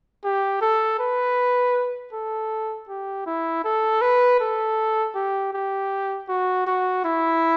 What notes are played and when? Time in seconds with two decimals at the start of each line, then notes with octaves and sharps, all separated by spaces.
0.24 G4
0.61 A4
0.99 B4
2.13 A4
2.89 G4
3.26 E4
3.64 A4
4.01 B4
4.40 A4
5.15 G4
5.53 G4
6.29 F#4
6.67 F#4
7.05 E4